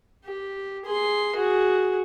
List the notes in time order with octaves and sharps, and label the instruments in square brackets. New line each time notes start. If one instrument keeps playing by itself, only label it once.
[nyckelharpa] G4
G#4 C6
F#4 G#4